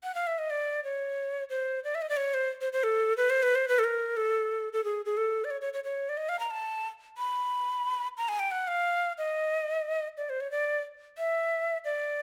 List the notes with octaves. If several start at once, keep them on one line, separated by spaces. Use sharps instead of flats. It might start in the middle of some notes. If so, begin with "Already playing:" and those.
F#5
F5
E5
D#5
D5
C#5
C5
D5
E5
D#5
D5
C#5
C5
C5
C5
A4
B4
C5
B4
C5
B4
A4
A#4
A4
A4
G#4
G#4
A4
D5
C#5
C#5
C#5
C#5
D5
D#5
F5
A#5
A5
B5
A#5
G#5
G5
F#5
F5
D#5
D5
C5
C#5
D5
E5
D5